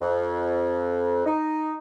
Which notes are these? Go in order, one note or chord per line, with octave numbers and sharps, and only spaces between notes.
F2
D#4